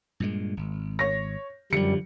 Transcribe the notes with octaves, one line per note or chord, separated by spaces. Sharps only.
G2 A#2 G#3
G#1
C#5 A#6
F#2 D3 F3 G3 C#7